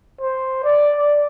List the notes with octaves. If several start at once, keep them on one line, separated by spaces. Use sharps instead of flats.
C5
D5
D5